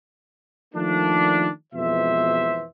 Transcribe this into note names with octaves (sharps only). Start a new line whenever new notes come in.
D#3 F3 A3 A#3 D4
F2 B2 E3 G#3 C5 E5